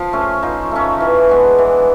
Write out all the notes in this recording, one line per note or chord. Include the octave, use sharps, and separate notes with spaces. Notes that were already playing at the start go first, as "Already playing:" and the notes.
Already playing: F3 F4
A3 C#4
F3 D#4
A3 C#4
E3
G#3 B3 D4
E3